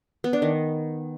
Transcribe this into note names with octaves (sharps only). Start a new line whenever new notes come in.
B3
D4
D#3